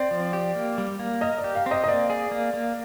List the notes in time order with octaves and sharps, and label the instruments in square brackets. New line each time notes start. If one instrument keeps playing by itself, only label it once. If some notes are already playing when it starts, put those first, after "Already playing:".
Already playing: [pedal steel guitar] C4 [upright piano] D5
[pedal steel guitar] F3
G4
A#3
G3
A#3
[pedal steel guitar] A#4 [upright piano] D#5
[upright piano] D5
[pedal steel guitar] G4
[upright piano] F5
[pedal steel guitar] C4 [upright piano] D#5
[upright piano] D#5
[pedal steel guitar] A#3 [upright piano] D5
[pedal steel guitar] G#4
A#3
A#3